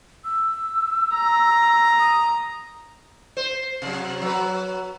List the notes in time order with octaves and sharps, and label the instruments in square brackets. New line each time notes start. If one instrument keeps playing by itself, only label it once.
[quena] E6
[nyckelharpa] A#5
[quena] D#6
[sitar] C5
C3 F#3
F#3 B4